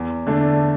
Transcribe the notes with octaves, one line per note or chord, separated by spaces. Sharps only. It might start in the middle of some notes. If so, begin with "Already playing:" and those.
Already playing: E2
D3 A3 D4